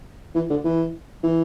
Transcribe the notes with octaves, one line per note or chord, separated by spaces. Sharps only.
E3
D3
E3
E3